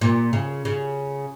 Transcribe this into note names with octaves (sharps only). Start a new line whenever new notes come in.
A#2
C#3
C#3